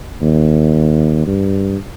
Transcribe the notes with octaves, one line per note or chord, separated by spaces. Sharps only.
D#2
G2